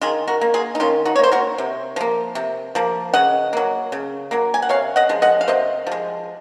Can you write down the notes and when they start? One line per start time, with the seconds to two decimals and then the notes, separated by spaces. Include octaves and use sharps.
0.01 D#3 F4 G#4
0.28 F#4 A#4
0.41 A#3
0.54 F4 G#4
0.75 D#4
0.80 D#3 C#4 F4
1.05 D#4 F#4
1.16 C#5
1.19 A#3 C5
1.32 F#4 A#4
1.58 C3
1.96 F3 A#3
2.35 C3
2.75 F3 A#3
3.14 C#3 D#5 F#5
3.53 F#3 A#3
3.92 C#3
4.31 F#3 A#3
4.54 G#5
4.62 F#5
4.69 C3 C#5 F5
4.96 D#5 F#5
5.09 F3 G#3
5.22 D#5 F#5
5.41 F5
5.48 C3 C5 D#5
5.87 F3 G#3